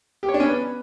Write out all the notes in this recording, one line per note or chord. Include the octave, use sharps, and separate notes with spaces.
G4
C#5
D4
C#4
B3